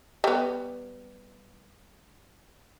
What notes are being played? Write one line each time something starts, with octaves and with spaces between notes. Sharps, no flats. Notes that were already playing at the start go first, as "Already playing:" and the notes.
G3 B3